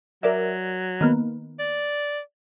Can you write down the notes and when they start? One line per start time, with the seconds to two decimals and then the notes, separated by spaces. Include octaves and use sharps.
0.23 F#3 A#4 D5 E5
1.01 D#3 A#3 B3
1.59 D5